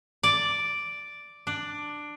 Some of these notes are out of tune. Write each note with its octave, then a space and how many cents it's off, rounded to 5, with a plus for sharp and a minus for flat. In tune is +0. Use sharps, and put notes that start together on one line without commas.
D5 +0
D4 +10